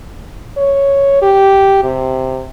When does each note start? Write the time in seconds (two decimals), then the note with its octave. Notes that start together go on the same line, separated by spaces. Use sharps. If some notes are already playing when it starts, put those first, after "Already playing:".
0.57 C#5
1.22 G4
1.83 C3